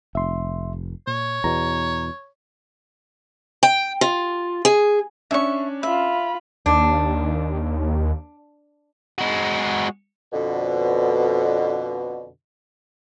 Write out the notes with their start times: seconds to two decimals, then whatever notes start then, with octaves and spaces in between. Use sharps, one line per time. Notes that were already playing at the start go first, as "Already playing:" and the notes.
0.15 F1 E5 C6
1.07 A#2 C#5
1.44 E2 B2 A#5
3.63 G5
4.01 F4
4.65 G#4
5.31 C#4 D4 E5 C#6
5.83 F4 E5 B5
6.66 D#2 D4
9.19 G#3 F#4
10.33 F2 B2 D3